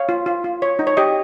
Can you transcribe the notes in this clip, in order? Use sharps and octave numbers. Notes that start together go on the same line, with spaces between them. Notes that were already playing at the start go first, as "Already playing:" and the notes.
Already playing: C#5 F5
F4
F4
F4
C#5
D#4
C#5
G4 D#5